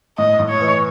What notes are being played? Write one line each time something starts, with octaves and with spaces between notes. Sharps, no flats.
A2 D#5
A2
C#5
E3